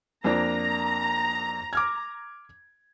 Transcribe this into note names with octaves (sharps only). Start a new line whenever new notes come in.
F2 A#3 D4 A#5
D6 F6 G#6